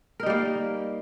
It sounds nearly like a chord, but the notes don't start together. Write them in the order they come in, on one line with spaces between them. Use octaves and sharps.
A#4 D#4 G3 A#3